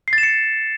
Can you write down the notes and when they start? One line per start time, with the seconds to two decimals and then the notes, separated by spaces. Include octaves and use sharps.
0.08 C7
0.13 A6
0.18 E7
0.23 C#7